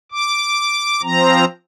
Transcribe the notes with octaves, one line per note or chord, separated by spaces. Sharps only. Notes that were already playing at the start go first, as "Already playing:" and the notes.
D6
F3 C4 A#5